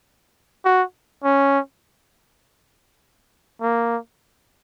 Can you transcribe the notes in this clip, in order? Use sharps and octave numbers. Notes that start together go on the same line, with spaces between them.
F#4
C#4
A#3